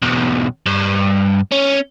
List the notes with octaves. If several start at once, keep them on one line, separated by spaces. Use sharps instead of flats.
B1 E2
G2
C#4